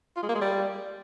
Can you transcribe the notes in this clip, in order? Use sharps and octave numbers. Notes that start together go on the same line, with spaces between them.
F4
G#3
A#3
G#3
G3